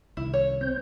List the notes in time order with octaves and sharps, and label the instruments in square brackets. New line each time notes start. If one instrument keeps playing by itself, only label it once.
[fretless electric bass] C2 C3 D#3 [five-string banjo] E4
[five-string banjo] C#5
[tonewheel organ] C4 C5 G6